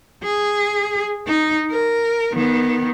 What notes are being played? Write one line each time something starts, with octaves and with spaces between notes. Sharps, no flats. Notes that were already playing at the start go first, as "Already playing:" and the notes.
G#4
D#4
A#4
D#3 B3